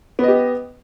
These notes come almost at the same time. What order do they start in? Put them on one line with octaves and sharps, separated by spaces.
B3 D#5 G4